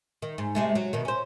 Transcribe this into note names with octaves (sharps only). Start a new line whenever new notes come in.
D#3
G#2
C3 G#3 A3
F#3
B2 D#3
C#4 C5